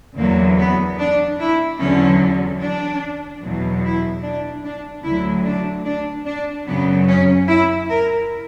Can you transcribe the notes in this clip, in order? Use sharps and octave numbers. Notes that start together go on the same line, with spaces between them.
E2 D3 F#3 A#3
B3
D4
E4
E2 D3 F#3 C#4
D4
E2 B2 F#3
E4
D4
D4
D2 D3 F#3 E4
D4
D4
D4
F#2 C#3 F#3 B3
C#4
E4
A#4